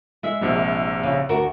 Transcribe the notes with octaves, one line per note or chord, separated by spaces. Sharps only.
G#3 E5
A#1 C3 G3
C#3
D2 F#4 A#4